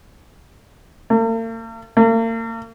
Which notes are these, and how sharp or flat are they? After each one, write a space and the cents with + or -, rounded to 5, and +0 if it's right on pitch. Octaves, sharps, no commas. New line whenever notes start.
A#3 -45
A#3 -40